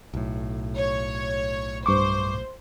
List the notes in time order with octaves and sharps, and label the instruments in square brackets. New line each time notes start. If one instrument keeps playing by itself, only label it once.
[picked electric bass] B1 A2
[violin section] C#5
[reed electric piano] G2 C#6 D6 [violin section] C5